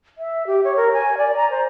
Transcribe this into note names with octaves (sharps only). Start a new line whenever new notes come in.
E5
G4
C#5
A#4
G#5
D5
A#5
C5